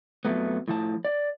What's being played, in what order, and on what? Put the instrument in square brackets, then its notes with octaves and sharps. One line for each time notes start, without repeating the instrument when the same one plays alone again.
[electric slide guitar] F2 A#2 F#3 A3 B3
A2 F3 A5
D5